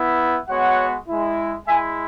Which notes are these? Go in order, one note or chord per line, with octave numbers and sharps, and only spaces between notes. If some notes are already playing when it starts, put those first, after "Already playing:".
Already playing: B3 E4
G#3 B3 F#4 C#5 F#5
G#3 E4
G#3 E4 E5 G#5